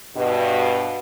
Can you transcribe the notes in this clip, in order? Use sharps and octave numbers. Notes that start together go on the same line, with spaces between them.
G2 B2